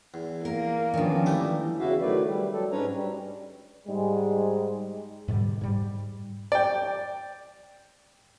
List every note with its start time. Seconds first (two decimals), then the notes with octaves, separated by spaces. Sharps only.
0.14 E2
0.45 A#3 A#4
0.94 D#3 F3 B3 C#4 D4
1.26 E3 G3 A3
1.80 E2 C#3 E4 F#4 E5 F5
2.02 D#3 F#3 A3 B4 D5
2.24 G3
2.52 F#3 A4
2.72 G#2 C#4 D4 B4 C#5 A#5
2.93 G3
3.88 G#2 G3 G#3
5.28 G#2 B2 D3 G3
5.61 G#2 G3
6.52 D5 G5